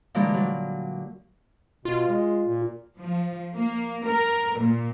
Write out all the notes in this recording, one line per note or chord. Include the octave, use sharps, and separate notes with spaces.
A#2 D3 E3 G3 G#3
F#3 G3
B2 F4
G#3
A#2
F3
A#3
A#4
A#2